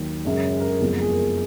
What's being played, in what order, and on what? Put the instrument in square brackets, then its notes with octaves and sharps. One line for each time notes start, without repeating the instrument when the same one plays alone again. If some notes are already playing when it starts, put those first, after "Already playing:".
Already playing: [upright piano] D#2 D#3 F#3
F#2 C#3 G#3
G#4
A#4
G#4
F#1 F2 F3 G#3 B3
G#4
A#4